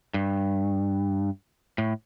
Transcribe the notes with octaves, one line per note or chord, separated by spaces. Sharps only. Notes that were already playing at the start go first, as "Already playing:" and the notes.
G2
A2